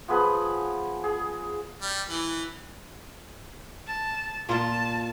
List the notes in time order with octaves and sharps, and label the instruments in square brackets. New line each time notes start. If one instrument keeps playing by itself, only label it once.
[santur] F3 B3 G#4 B4
G#4
[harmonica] G3
E3
[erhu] A5
[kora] A#2 F4 [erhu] A5